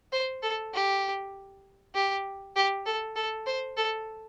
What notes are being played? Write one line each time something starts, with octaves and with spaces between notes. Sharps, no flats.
C5
A4
G4
G4
G4
A4
A4
C5
A4